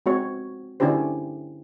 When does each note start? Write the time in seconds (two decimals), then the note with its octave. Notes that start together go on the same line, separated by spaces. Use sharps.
0.06 G#3 C4 F#4 C#5
0.80 D3 C#4 D4 E4 G4 C5